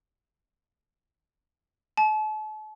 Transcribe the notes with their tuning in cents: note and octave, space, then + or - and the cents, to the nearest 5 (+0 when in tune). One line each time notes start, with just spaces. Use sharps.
A5 -40